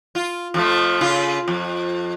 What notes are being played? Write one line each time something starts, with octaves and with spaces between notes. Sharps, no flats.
F4
F2 F3 A3
C#3 F4
F2